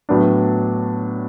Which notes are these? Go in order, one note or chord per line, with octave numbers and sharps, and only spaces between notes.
A2 F#3 B3 D4